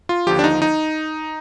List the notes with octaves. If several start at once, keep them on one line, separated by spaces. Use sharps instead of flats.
F4
D#2 D3 F3 G4
D4
D#4
D#4